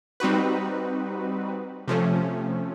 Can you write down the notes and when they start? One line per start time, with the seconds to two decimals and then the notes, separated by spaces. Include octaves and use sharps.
0.20 G3 C4 D#4 F#4 B4
1.88 C3 F3 A3 C#4